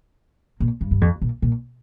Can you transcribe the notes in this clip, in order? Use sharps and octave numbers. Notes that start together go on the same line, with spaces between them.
A#2
G2
G2
F2
A#2
A#2